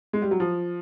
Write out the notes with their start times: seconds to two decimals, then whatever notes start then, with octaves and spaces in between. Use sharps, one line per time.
0.13 G#3
0.22 G3
0.31 F#3
0.40 F3